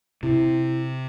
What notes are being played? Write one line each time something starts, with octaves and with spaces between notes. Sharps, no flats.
C3 E4